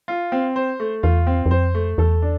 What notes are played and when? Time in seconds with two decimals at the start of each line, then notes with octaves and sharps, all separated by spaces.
0.08 F4
0.32 C4
0.56 C5
0.80 A3
1.03 E2 F4
1.27 C4
1.46 E2
1.51 F2 C5
1.75 A3
1.98 E2 A4
2.22 D4